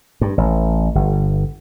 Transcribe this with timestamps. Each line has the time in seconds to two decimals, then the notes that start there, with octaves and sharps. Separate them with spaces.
0.21 G2
0.38 A1
0.95 G1